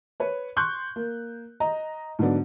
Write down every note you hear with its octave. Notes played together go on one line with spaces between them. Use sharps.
B4 C#5
C6 C#6 F#6 G6
A#3
D#5 A#5
G#2 D3 F#3 B3 D4